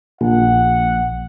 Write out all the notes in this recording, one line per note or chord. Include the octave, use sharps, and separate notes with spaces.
A#1 F#5